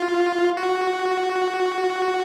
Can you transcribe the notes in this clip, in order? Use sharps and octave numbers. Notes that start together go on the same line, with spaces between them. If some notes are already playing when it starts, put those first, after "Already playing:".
Already playing: F4
F#4